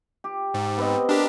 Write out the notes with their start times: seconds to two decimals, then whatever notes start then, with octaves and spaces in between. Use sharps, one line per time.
0.24 G4
0.54 G#2
0.78 B3 C4 D#5
1.09 D4 G4 A#4